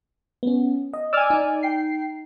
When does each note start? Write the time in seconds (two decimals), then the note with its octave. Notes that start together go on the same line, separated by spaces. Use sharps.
0.43 B3 C#4
0.94 D#5
1.13 D5 G#5 E6 F6
1.30 D#4
1.63 G5 C7